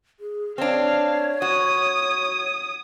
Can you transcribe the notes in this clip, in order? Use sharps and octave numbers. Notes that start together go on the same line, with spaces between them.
G#4
C4 D4 C#5 F5
F#4 D#6